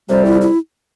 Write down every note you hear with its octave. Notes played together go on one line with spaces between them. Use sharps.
F2 C3 G3 C5
E4
E4